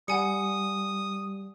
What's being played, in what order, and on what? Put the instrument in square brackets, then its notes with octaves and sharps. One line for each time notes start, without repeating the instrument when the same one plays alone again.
[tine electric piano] G3 [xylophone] F#5 G#5 C#7 [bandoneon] D#6